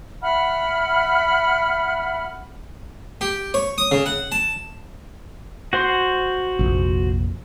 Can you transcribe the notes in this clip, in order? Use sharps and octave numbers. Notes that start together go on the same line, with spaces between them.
E5 F#5 B5 F6
G4
C#5
D#6
C#3
F#5
A5
F#4 C5 C6
F1 A#1